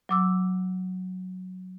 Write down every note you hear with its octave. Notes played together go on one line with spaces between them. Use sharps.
F#3 D6 E6